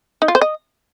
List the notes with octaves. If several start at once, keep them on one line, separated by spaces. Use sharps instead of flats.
D#4
F4
C5
D#5